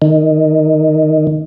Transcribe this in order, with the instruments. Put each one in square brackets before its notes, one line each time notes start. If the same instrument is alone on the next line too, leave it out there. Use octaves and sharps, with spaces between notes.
[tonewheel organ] D#3